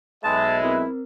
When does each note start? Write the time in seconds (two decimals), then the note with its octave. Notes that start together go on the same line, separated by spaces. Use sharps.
0.24 B1 G#3 B4 D#5 E5 A5 G6 G#6
0.62 C4 E4 A#4